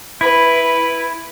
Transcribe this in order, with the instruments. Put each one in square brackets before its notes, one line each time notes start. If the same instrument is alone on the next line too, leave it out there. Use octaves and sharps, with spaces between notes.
[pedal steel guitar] E4 [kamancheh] B4